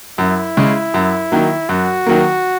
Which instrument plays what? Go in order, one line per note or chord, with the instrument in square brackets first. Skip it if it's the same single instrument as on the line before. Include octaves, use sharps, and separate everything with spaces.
[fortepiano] F#2 [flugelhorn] E4
[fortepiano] C#3 G#3
F#2
D#3 F#3 A#3
[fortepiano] F#2 [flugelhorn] F#4
[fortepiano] D#3 F#3 A#3